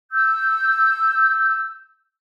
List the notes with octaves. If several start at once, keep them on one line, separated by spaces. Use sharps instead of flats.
E6 G6